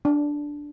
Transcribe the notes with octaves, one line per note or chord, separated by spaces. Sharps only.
D4